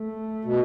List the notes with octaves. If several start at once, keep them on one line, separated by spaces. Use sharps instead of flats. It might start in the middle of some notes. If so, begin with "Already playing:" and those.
Already playing: A3
B2